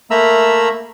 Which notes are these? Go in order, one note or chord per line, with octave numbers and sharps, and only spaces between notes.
A3 A#3 E5 A#5 B5 E6